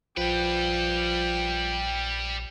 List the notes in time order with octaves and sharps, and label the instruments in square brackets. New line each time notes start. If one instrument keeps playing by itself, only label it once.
[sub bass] A#1 [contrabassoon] F3 [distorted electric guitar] G3 B4 [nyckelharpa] G5